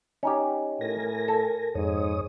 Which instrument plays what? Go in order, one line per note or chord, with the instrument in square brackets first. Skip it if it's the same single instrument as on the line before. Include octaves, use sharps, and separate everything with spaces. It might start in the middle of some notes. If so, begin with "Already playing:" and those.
[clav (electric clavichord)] C#4 D#4 G4
[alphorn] A2 [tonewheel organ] A#4 G#5 A#6
[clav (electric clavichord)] A4
[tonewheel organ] F2 C#5 D#6 [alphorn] G#2